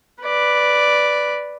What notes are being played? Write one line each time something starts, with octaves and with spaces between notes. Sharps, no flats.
B4 D5